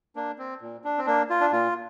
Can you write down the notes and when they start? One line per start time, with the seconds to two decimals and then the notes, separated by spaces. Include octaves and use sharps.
0.16 A#3 D4
0.38 C4
0.61 A#2
0.84 D4
0.98 C4
1.06 A#3 D4
1.30 F4
1.41 D4
1.52 A#2 F4